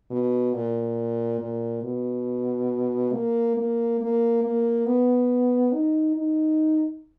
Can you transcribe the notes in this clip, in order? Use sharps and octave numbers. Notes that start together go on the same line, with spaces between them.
B2
A#2
A#2
B2
A#3
A#3
A#3
A#3
B3
D#4
D#4